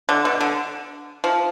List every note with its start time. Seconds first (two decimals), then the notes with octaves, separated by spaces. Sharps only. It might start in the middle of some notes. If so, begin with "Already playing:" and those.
0.09 D3
0.25 B2
0.41 D3
1.24 F3